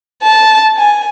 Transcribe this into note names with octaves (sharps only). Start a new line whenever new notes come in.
A5
G#5